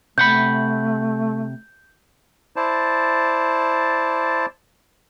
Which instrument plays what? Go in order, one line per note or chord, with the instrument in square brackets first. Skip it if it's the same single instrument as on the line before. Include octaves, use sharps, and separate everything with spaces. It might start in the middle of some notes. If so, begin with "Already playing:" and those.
[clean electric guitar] C3 F#5 B5 [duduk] A3 [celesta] G6
[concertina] E4 C5 D5 A5